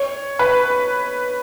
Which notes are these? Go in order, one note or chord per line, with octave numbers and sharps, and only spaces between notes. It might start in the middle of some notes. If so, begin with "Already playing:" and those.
Already playing: C#5
B4